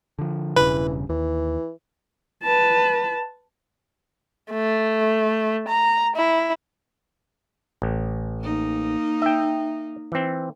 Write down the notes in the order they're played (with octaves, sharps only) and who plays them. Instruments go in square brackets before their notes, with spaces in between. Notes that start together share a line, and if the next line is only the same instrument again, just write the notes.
[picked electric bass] D3 F3
[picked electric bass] E1 G2 C#3 [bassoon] E3 [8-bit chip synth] B4
[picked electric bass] D#2 [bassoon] E3
[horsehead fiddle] B4 A5
[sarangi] A3
A#5
E4
[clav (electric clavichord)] A1
[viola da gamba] A#3 D#4
[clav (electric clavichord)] E5 G5
E3 C4